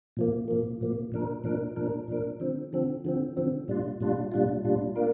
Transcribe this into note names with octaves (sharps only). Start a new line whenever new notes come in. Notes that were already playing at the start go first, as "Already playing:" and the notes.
A#2 F3 A#3
A#2 F3 A#3
A#2 F3 A#3
A#2 F3 D4 A#4
A#2 F3 D4 A#4
A#2 F3 D4 A#4
A#2 F3 D4 A#4
D3 F3 C4
D3 F3 C4
D3 F3 C4
D3 F3 C4
A#2 G3 D4 F4
A#2 G3 D4 F4
A#2 G3 D4 F4
A#2 G3 D4 F4
A#3 D4 F4 A#4